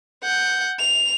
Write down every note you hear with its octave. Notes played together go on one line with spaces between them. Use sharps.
F#5 G6
F7